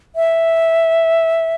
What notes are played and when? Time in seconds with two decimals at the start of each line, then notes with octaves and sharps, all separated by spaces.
0.16 E5